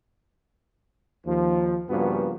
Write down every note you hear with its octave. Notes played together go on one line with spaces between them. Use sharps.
D#2 F3
G2 C#3 F3 A#3 B3 F#4